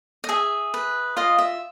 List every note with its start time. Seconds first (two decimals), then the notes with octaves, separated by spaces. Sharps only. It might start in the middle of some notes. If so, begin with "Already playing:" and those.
0.24 D#5
0.29 G#4 E5
0.74 B4
1.16 F4 D#5 F5
1.38 E5